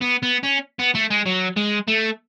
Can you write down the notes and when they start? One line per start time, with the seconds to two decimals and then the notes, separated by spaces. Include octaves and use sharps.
0.02 B3
0.23 B3
0.43 C#4
0.79 B3
0.95 A3
1.11 G#3
1.26 F#3
1.57 G#3
1.88 A3